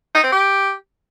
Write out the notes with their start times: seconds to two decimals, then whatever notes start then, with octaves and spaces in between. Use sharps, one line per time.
0.15 D#4
0.23 C4
0.32 G4